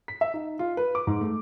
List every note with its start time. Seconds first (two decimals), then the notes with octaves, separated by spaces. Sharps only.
0.08 B6
0.21 E5
0.34 D#4
0.59 F4
0.77 B4
0.95 D6
1.07 G#2
1.21 A3